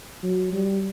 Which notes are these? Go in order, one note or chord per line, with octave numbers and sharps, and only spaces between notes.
F#3
G3